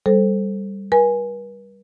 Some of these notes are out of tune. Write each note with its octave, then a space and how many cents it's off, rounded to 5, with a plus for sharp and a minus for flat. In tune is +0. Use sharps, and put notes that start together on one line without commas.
G3 +0 A4 +0 C5 +0
B4 -45 G#5 +0